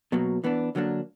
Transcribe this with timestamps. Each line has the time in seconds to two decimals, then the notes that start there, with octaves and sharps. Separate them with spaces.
0.12 B2 F#3 A#3
0.44 E3 B3 D4
0.75 D3 F#3 A#3 D4